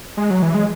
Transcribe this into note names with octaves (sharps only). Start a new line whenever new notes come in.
G#3
F#3
E3
G#3